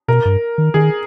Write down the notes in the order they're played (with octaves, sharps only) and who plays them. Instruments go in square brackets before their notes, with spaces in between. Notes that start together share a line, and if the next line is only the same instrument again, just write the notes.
[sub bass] B2 [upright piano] A#4
[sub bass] G2
D#3
[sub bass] D#3 [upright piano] G#4